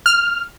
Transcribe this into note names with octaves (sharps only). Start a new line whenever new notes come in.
F6